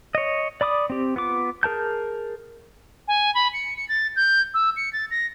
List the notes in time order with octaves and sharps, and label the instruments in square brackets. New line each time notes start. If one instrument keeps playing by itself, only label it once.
[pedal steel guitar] C#5 D#5
D5 B5 D6 D#6
C4 G4
B3 F4 D6
G#4 A#4 A5 G6
[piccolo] G#5
B5
C#7
C#7
A6
G6
E6
C#7
A6
A#6